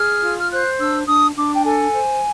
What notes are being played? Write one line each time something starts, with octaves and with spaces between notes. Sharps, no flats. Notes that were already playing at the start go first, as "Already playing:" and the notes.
Already playing: G#4 F6
F4
F6
C5 F#6
D4 E6
D4 D#6
D4 D6
G5
A4 G#5
C5